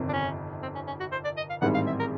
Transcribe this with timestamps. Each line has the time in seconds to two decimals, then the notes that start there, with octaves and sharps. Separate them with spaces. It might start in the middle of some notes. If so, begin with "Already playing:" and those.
Already playing: G1 F2 C3 D#3
0.09 D4
0.13 C#4
0.62 C4
0.75 C#4
0.87 C#4
1.00 F#4
1.12 C5
1.24 D5
1.37 D#5
1.50 F5
1.62 A1 G#2 D#3 G3 C4 F#5
1.74 F5
1.87 E5
1.99 A#4